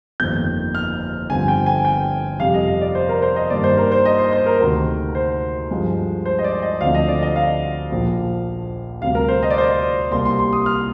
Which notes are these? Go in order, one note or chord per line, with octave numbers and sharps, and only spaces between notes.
G1 F2 D#3 A#3 G6
F6
G1 G2 D3 F3 C4 G#5
G5
G#5
G5
F2 C3 G3 F5
D#5
D#5
D5
C5
A#4
C5
D#5
G2 D#3 A#3 D5
C5
A#4
C5
D#5
C5
C5
A#4
D2 C3 D#3 A#4
C5
G2 F3 G#3
C5
D#5
D5
D#5
D2 D3 F3 C4 F5
D#5
D5
D#5
F5
A#1 A#2 F3 A#3
D2 C3 G3 C4 F5
A#4
C5
D#5
D5
C5
D5
C2 C3 G3 A#3 C6
C6
C6
D#6
F6